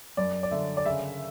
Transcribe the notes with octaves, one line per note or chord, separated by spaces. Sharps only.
F#2 D5
D5
D3 E5
D5
C#3 E5